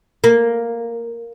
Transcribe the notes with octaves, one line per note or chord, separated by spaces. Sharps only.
A#3